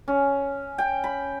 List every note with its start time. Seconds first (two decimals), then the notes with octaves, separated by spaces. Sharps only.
0.08 C#4
0.78 G5
1.04 B5